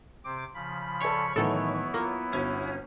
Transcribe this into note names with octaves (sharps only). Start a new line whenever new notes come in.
C3 C4 D6
C#3 F3 B5
A4 C#5 D5 G#5
A2 D#3 E3 F#3 B3 E4 A4
A#3 F4
G1 C#4 F#4